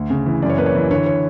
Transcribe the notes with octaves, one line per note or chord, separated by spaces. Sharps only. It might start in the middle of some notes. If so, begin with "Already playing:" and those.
Already playing: D2
C#3
E3
F#2 D5
C#5
A#3 B4
C#5
E3
D3 C#5
C#5